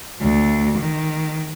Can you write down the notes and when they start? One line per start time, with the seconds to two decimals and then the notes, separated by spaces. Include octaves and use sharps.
0.21 D2
0.78 D#3